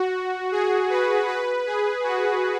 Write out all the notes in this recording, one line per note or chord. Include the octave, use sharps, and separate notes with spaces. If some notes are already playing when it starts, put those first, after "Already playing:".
Already playing: F#4
G#4
B4
B4
G#4
F#4